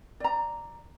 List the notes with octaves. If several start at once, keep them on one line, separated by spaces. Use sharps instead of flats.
D5 A#5